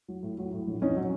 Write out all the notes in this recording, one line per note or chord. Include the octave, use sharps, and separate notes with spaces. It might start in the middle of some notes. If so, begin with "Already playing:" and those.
F#3
A2
F#3
A2
A#1
A#1 C#4 D#4
F#3